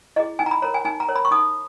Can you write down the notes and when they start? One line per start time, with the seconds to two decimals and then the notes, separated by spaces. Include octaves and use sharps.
0.16 E4 G#4 D#5
0.39 D#4 G#5
0.46 A#5
0.51 B5
0.62 A#4 C#5 A#5
0.74 G#5
0.85 D#4 G#5
1.00 A#5
1.08 A#4 C#5
1.16 B5
1.25 C#6
1.31 D#4 D#6